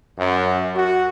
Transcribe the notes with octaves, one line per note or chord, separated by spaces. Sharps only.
F#2
F#4